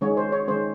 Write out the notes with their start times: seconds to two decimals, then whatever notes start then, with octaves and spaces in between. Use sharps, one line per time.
0.01 D#3 G#3 C#4 C#5
0.17 C5
0.32 C#5
0.48 D#3 G#3 C#4 C5